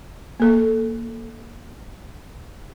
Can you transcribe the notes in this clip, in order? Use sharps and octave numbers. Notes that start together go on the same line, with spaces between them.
A#3 A4